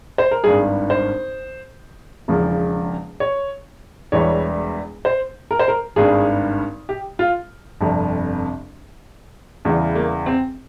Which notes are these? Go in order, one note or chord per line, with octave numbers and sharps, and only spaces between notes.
C5
A#4
G#1 G2 G3 G#4
C5
E1 E2 C#3 F3
C#5
E1 E2 E3 G3 C#5
C5
A#4
C5
A#4
G#1 G2 G3 G#4
G4
F4
G1 F2 C3 G3
E2 C#3 E3 G3
A#3
C4